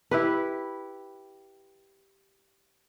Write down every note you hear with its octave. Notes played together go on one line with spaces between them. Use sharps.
E4 G4 B4